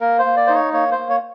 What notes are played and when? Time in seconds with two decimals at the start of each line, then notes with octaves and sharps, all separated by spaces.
0.01 A#3 A#4
0.19 C5
0.25 A#3
0.37 D5
0.47 D#4 C5
0.55 C#5
0.73 A#3 C#5
0.92 C5
0.98 A#3
1.10 C#5